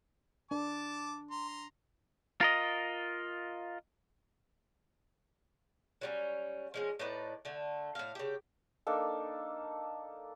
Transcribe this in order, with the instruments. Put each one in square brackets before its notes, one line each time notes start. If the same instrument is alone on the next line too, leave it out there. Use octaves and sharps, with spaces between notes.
[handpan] D4 [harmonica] A5 D6
[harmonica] A#5 C6
[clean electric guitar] F4 A#4 D#5
[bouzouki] F#3 G3 C#4
F3 G#3 C#4
A2 D#4 B4 D5
D3 A3
A2 F5
C#3 G4
[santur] A#3 D4 D#4 A4